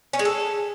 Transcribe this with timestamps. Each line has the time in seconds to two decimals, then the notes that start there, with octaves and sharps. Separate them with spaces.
0.13 C#4
0.19 G#3
0.25 A4